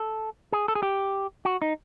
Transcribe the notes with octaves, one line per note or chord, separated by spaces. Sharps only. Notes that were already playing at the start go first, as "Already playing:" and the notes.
Already playing: A4
G#4
A4
G#4
G4
F#4
D#4